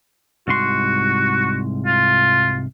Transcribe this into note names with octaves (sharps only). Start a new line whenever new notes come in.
C2 G#2 F#4 C6
F4